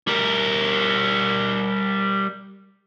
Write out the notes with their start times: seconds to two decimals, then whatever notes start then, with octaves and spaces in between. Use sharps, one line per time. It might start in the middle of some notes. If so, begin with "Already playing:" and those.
0.08 G3 A#4